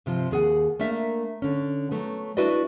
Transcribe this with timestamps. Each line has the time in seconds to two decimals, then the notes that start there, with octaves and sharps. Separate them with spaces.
0.06 G2 C3 F3
0.31 D#2 G#4 F#5
0.80 A3 A#3 D4 A#4 E5
1.42 D3 C#4
1.91 F#3 A3 B3
2.37 D4 E4 F#4 B4 D5 D#5